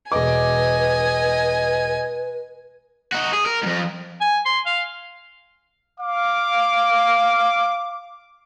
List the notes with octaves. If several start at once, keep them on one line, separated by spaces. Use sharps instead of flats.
E1 B4 D#5 G#5 D6
D#4 F#4
G#4
A#4
F2 G#2
G#5
C6
F5
F5 D6